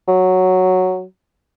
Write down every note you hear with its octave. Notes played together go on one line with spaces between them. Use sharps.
F#3